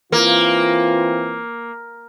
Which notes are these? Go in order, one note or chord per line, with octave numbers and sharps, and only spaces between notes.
E3 A#3 C4 F4